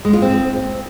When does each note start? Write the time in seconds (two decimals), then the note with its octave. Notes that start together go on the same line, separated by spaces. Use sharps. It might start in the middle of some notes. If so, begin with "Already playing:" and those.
0.05 G#3
0.13 F4
0.22 C4